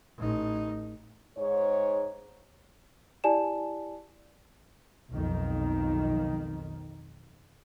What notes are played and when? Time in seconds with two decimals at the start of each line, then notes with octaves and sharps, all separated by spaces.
0.18 A1 D#4
1.37 G#2 C#5
3.24 E4 G4 D5 G#5 A5 E7
5.10 B1 F2 D#3